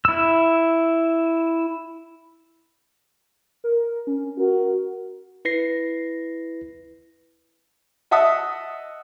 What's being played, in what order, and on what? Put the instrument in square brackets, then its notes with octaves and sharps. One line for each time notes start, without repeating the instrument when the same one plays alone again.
[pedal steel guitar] E4 E6
[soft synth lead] A#4
C#4
[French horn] F#4 [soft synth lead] A#4
[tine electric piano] E4 B4 A#6 C7
[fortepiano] D#5 E5 F#5 A5 D#6